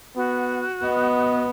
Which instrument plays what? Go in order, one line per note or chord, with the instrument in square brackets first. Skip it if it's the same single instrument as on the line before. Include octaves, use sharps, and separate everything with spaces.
[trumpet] B3 [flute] F#4
[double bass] B3 [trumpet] D#5